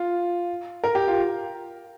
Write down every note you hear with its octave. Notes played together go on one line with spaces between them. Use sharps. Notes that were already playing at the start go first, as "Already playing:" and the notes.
Already playing: F4
A#4
G4
F4